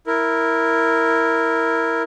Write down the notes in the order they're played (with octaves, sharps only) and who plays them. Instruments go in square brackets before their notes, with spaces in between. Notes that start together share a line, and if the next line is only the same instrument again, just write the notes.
[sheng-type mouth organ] E4 A#4